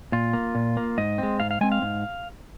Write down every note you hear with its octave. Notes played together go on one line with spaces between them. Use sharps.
A#2 F4
A#3
A#2
A#3
G#2 D#5
G#3 C4
G#2 F5
F5
G#3 C4 G#5
F5
G#2